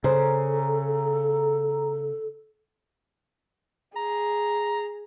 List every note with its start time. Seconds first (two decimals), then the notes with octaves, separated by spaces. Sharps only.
0.04 C#3 A4 C5 A#5
3.96 G#4 A#5